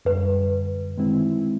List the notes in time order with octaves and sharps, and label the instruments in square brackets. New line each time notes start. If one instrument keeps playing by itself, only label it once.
[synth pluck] F#2 D3 G3 [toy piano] B4
[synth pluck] D#3 G#3 C4 E4